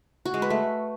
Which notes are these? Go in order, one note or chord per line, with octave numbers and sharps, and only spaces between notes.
F#4
G#3
B4
A3